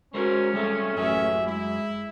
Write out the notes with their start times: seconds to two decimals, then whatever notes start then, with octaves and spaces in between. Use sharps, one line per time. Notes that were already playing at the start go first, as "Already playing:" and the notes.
0.14 G#3 C#4 F#4 A#4 C5
0.54 G3 A4 E5
0.96 A1 F#2 G#4 E5
1.46 G#3 E4